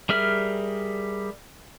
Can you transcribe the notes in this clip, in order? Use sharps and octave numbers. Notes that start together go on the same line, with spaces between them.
G3 G#4 A#4 E5 F6